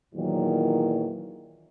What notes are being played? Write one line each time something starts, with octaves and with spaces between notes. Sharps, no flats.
E2 A#2 D#3 E3 F#3